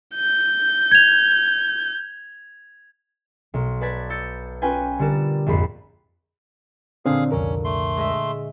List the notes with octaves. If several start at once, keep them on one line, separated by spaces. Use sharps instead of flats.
G6
G#6 F7
B1
B4 D5 A5 G#6 B6
E6 G6 A6 C#7
C#4 F4 B4 G5 G#5
D3 G3 B3 A#4 D5 E7
A#1 F2 G#2 B5 C7
A#2 D3 C4 D4 G#4 F5
C2 F2 C#4 A#4
A3 C6
G#3 D#5 E5